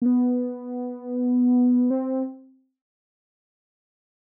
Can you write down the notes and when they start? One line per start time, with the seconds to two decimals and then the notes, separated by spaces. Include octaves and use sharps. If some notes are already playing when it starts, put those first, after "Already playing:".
0.02 A#3
0.06 B3
1.90 C4